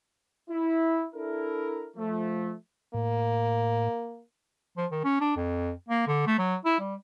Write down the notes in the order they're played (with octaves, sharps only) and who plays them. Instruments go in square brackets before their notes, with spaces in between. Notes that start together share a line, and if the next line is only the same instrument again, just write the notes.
[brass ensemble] E4
D4 E4 A4 A#4
F3 A3
[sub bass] A2 [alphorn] A#3
[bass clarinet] F3
D#3
C#4
D4
F2
A#3
D3
A3
F#3
E4
G3